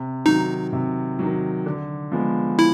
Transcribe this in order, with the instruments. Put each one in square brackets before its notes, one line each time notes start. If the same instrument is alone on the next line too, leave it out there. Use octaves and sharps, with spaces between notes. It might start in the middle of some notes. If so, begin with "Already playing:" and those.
Already playing: [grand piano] C3
[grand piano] D#3 F#3 [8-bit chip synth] D#4
[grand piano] C3
D#3 F#3
D3
F3 G#3 B3
[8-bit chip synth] E4